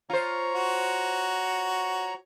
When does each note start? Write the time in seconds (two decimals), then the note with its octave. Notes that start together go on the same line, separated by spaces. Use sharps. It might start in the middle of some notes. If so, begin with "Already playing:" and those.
0.10 F4 C5 C#5 A#5 C#6
0.55 F#4